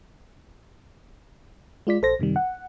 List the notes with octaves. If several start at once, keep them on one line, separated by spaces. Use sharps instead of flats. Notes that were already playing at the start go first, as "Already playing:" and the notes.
G#3 F4 D5 B6
A#1 A4 C5 A#6
F#2 C3 D#3 G3
F#5